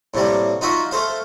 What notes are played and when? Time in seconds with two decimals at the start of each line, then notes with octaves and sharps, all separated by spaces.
0.14 A2 C3 G3 A#3
0.61 D#4 F4 F#4 E5
0.91 A3 A4 C5 F5